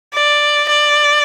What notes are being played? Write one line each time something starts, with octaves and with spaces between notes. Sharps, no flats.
D5
D5